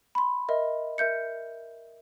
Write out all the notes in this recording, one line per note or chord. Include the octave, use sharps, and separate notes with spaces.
B5 C6
A#4 D#5 E5
A#4 E5 G6 C#7